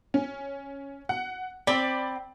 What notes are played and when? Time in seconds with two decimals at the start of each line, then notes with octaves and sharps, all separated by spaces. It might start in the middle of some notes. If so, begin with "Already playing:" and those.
0.14 C#4
1.09 F#5
1.67 C4 D5 B5